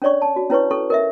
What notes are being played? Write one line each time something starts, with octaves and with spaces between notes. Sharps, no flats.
C#4 D4 C#5 D5 C#6
A5
F#4
C#4 E4 B4 C#5 C#6
C#4 A4 C#6
A#4 D#5 E5